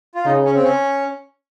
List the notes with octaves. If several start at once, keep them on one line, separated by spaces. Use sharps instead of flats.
F4
C#3 D#4
C#4
C4
C#4